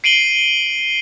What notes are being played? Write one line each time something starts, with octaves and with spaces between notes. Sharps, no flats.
C7 D7 D#7 F#7 G7